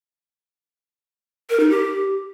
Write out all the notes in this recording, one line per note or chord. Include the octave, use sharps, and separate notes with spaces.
A#4
D#4
G4